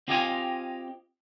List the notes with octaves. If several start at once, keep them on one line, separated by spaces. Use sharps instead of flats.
C4 F4 G4 D#5 F5 G#5